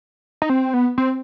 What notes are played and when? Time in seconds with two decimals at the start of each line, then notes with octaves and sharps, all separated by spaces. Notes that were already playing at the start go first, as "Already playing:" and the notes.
0.42 D#4
0.49 C4
0.74 B3
0.98 C4